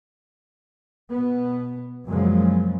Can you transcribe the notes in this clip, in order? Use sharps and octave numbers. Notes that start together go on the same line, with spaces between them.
B2 B3
F#2 A#2 C#3 F3 F#3 G#3